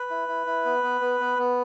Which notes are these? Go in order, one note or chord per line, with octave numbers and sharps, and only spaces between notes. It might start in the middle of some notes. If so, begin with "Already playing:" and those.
Already playing: B4
E4
E4
E4
B3
B3
B3
B3
B3